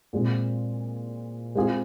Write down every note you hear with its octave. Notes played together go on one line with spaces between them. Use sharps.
A#2 G#3 C4 F4
G#3 C4 F4 G#4